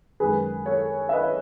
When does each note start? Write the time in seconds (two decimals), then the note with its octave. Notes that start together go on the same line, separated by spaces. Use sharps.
0.20 F#2 D#3 G#3 G#4 B4
0.66 A4 C#5
1.09 E5
1.12 B4 D#5